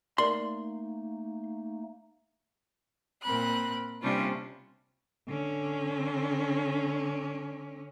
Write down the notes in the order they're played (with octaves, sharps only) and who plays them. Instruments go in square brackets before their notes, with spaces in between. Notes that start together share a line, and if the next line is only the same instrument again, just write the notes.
[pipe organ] A3 A#3 D#4 [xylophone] A#4 D5 F#7 [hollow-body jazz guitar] C6
[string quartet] A#2 C4 A#4 B5 F#6
C3 G3 A#3 C#4 D4 F4
[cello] D3 C#4